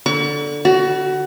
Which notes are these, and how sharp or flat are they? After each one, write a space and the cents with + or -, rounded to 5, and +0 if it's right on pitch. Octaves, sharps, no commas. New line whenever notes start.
D3 +0 C#6 +40
F#4 +20 B5 -25